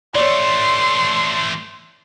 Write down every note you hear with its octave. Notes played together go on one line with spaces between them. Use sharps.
E3 A3 C#5 D5 C6